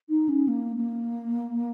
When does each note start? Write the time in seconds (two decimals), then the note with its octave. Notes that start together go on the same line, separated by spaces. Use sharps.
0.09 D#4
0.29 C#4
0.48 A#3
0.77 A#3